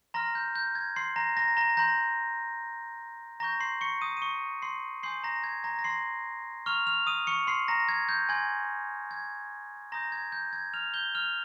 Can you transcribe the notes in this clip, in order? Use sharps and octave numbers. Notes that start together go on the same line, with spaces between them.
A#5 C6 F6 A#6
G6
G6
G#6
C6 C7
A#5 A#6
A#5 A#6
A#5 A#6
A#5 C6 G6 A#6
A#5 C#6 G6 A#6
C6 C7
C#6 C#7
D#6 D#7
D#7
C#6 C#7
C6 C7
G#5 C6 D#6 G6 C7
A#5 A#6
G#6
A#5 A#6
A#6
C6 C7
A#5 C#6 F6 F7
F6 F7
D#6 D#7
C#6 C#7
C6 C7
A#5 A#6
G#6
G6
G#5 C6 G6 G#6
G#6
A#5 C6 D#6 G6 A#6
G#6
G6
G#6
F6 F7
G6 G7
F6 F7